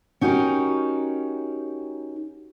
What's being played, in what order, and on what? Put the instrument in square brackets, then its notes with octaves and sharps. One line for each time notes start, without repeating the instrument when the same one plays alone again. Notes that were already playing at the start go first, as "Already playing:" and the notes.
[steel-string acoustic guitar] C#4 D#4 F#4 G4 A#4